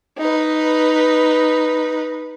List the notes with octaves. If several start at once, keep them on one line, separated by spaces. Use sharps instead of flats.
D#4 B4